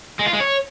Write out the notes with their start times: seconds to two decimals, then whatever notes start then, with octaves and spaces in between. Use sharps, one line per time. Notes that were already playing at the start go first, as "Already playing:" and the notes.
0.19 G#3
0.26 F4
0.33 G#3
0.40 C#5